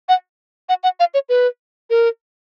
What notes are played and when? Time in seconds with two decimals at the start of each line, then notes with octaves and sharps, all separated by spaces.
0.09 F#5
0.69 F#5
0.84 F#5
1.00 F5
1.14 C#5
1.29 B4
1.90 A#4